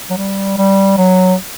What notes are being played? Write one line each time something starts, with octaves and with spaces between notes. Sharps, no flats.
F#3
G3
G3
F#3